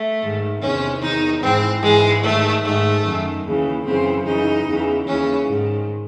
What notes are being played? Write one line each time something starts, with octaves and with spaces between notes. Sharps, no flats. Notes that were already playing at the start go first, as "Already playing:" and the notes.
Already playing: A3
G#2 D#3
E2 C3 D#3 C#4
E2 D#3 D#4
G#2 E3 C4
G#2 E3 G#3
G#2 D#3 A3
G#2 D#3 A3
F#2 D#3
D#2 C#3 E3
F#2 C#3 E3 C4
F#2 C#3 E3 D#4
E2 C#3 E3
D#2 C#3 E3 C#4
G#2 D#3